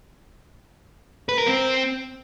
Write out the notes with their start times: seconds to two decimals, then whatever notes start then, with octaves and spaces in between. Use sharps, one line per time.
1.29 B4
1.38 A#4
1.47 C4